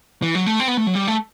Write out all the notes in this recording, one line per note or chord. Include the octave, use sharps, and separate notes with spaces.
E3
F#3
A3
C4
B3
A3
F#3
G3
A3